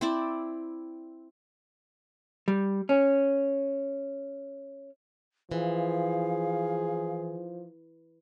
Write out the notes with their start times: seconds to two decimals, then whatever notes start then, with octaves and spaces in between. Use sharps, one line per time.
0.01 C4 E4 D5
2.48 G3
2.89 C#4
5.51 E3 F3 G#4 F5